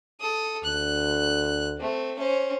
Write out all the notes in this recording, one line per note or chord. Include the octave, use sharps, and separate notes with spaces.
A4 D#6
D2 F#6
A3 C4
C#4 C5